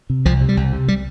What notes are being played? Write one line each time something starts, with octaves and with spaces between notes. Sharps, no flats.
C3
C2 F3
C3
G3
C2
C3
G3